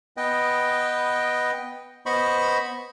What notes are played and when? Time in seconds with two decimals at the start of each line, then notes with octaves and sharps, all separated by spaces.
0.17 B3 B4 D#5 G5
2.06 B3 C5 D#5 B5 C#6